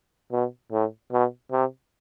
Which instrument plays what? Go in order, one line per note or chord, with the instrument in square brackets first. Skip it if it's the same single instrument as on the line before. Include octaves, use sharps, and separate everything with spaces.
[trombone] B2
A2
B2
C3